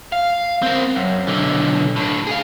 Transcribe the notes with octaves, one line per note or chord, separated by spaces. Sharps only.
F5
C4 A#4
F#2
B1 D3
A2 D4
G#4 F5